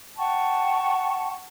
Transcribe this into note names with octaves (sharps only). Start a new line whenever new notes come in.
F#5 G5 A5 C#6